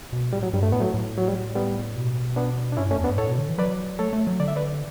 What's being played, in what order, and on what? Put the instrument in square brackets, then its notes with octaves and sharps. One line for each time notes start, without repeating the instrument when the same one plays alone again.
[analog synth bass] B2
[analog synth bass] A2 [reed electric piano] G3
[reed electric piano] F#3
[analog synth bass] G2 [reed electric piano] G3
[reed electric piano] A3
[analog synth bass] A2 [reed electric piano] B3
[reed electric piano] F#3 A3
[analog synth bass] A2
[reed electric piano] F#3
G3
G3 B3
[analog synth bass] B2
[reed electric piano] B3 D4
D4
[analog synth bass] G2 [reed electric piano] C#4 E4
[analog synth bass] F#2 [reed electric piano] A3 C#4
[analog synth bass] E2
[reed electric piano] B3 D4
[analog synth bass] G2
[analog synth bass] A2 [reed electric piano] A4 C#5
[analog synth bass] B2
D3
E3
[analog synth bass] F#3 [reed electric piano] B4 D5
[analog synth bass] A3 [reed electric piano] A4 C#5
[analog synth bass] A3
F#3
[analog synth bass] D3 [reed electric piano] D5
[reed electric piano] E5
B4 D5